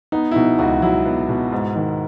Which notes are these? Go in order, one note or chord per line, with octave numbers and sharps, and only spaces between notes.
B3 D#4
E4
B2 D#4
C#2 F#4
F#3 E4
B3
B2
G#2
D#3